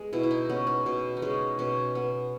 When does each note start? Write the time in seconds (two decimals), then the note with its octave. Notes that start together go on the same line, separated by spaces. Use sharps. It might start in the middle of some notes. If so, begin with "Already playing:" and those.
Already playing: G#3 B3
0.13 B2 E4
0.23 E4
0.31 D#4
0.50 B3 C#4
0.67 B3
0.86 B2
1.17 D#4
1.22 G#3 C#4
1.59 B2 C#4
1.95 B3